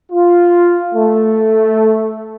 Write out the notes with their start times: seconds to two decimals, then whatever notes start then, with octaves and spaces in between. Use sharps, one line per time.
0.11 F4
0.94 A3